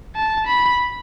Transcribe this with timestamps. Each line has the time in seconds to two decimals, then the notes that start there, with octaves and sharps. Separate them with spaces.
0.15 A5
0.47 B5